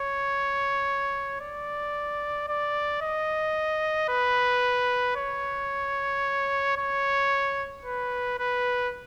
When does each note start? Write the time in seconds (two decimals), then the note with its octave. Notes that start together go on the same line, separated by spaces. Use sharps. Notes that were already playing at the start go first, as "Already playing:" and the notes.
Already playing: C#5
1.41 D5
2.48 D5
3.02 D#5
4.09 B4
5.16 C#5
6.77 C#5
7.85 B4
8.39 B4